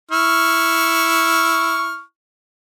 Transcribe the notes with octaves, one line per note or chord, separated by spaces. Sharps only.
E4 C#6 F6